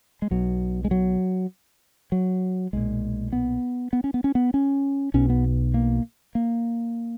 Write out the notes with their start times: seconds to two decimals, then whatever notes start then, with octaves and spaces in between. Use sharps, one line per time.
0.22 G#3
0.31 B1 B2 F#3
0.85 G#3
0.91 F#3
2.12 F#3
2.73 B1 A#2 G#3
3.33 B3
3.93 B3
4.04 C#4
4.14 B3
4.24 C#4
4.35 B3
4.54 C#4
5.14 B1 B2 C#4
5.30 B3
5.74 A#3
6.35 A#3